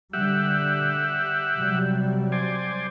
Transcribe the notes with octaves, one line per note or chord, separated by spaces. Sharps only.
D3 G3 G4 E5 F#5
C3 F#3 G3
C5 D5 G#5